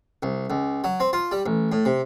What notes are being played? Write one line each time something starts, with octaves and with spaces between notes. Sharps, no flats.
C2
C#2
F#3
C4
F4
G3
A1
A2
C3